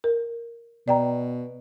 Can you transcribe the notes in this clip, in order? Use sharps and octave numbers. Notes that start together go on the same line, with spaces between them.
A#4
B2 D5 G5 A#5